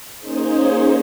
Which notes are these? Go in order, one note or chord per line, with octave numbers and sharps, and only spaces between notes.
A#3 C#4 D#4 G#4 C5